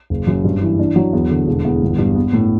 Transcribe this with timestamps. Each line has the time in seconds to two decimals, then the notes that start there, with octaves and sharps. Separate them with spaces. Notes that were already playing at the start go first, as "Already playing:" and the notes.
0.10 F#1
0.27 F#2
0.45 G2
0.62 E3
0.79 D4
0.96 F#3
1.13 E2
1.30 D3
1.47 E1
1.65 E2
1.82 G1
1.98 G2
2.15 B3
2.33 A2